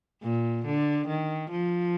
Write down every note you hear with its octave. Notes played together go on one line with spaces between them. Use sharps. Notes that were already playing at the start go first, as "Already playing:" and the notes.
A#2
D3
D#3
F3